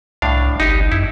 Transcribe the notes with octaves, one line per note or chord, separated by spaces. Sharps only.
C2 A2 D4 F5
G1 D#4 G4
F#2 E4